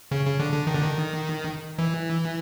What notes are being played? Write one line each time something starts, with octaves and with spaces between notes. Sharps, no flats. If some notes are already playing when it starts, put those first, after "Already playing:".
C#3
C#3
D3
D3
D#3
D3
D#3
E3